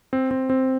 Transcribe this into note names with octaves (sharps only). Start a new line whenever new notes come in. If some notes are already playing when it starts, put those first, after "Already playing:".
C4
C4
C4